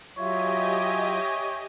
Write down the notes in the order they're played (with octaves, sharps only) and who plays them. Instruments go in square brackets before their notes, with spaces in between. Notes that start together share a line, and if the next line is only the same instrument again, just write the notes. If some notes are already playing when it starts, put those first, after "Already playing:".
[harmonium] F#3 F4 [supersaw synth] G4 D#5 G#5 [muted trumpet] C#5 [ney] E5